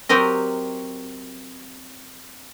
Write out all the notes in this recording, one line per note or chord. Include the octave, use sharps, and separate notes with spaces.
F#3 C4 G4 A#4 D#5